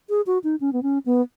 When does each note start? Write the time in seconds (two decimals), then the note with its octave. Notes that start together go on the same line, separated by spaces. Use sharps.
0.10 G#4
0.27 F#4
0.44 D#4
0.61 C#4
0.73 B3
0.83 C#4
1.06 B3